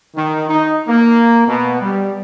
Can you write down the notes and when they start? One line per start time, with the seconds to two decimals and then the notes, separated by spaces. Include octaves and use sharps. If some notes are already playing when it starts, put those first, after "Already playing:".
0.15 D#3
0.48 D#4
0.87 A#3
1.47 B2
1.80 G3